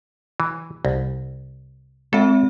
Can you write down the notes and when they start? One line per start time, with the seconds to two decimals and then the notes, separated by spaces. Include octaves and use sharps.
0.40 E3
0.85 C2
2.13 G#3 C4 A4 E5